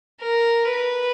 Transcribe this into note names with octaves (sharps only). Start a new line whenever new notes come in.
A#4
B4